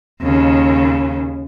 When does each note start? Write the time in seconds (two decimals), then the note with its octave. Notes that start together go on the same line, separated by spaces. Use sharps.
0.22 D#2 C#3